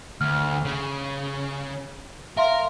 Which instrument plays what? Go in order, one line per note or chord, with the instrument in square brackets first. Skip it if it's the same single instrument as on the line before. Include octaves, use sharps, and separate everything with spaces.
[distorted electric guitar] D2 [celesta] F6
[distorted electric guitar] C#3
[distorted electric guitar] A#4 [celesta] E5 F5 C6